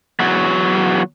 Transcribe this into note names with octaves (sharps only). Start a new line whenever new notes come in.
E2 F#3